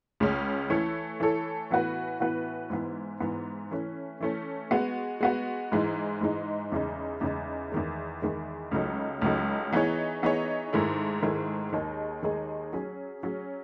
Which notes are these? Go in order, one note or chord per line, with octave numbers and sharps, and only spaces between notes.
C#2 C#3 G#3 C#4
E3 A3 E4 A4 C#5
E3 A3 E4 A4 C#5
A2 E3 B3 F#4 B4
A2 E3 B3 F#4 B4
G#2 E3 B3
G#2 E3 B3
E3 A3 C#4
E3 A3 C#4
G#3 B3 F#4
G#3 B3 F#4
G#2 E3 G#3 D#4
G#2 E3 G#3 D#4
E2 C#3 G#3 D#4
E2 C#3 G#3 D#4
E2 D#3 G#3
E2 D#3 G#3
C#2 C#3 F#3 A3 D#4
C#2 C#3 F#3 A3 D#4
E3 B3 D#4 G#4 C#5
E3 B3 D#4 G#4 C#5
G#2 D#3 A3 E4 G#4
G#2 D#3 A3 E4 G#4
D#2 D#3 G#3 D#4 G#4
D#2 D#3 G#3 D#4 G#4
F#3 C#4 G#4
F#3 C#4 G#4